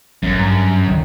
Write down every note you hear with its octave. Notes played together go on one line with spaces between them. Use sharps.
A1 F#2
G2
D2 D3 D#3